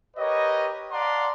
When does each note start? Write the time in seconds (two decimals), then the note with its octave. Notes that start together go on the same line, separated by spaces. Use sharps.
0.17 G4 A#4 B4 C#5 D#5
0.91 D5 F5 F#5 A5 A#5 C6